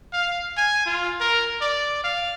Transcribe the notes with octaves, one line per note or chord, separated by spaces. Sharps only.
F5
G#5
F4
A#4
D5
F5